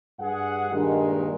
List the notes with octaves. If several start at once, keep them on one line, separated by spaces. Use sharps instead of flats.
G2 G#4 F#5
G2 A#2 D#3 G#3